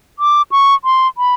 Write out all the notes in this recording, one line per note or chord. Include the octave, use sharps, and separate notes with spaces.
D6
C#6
C6
B5